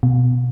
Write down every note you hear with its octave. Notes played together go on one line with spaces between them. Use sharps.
B2